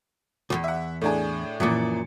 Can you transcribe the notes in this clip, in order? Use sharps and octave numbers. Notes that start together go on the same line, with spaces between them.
B1 E2
E5 F#5
A2 D4 G#4
F#2 A#2 E3 F3 C#7